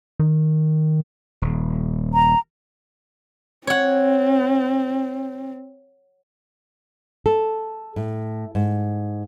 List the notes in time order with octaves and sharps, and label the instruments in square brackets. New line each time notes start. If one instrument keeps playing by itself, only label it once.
[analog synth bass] D#3
[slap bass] D#1
[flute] A#5
[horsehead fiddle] C4 [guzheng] C#5 F#5
[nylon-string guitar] A4
A2
G#2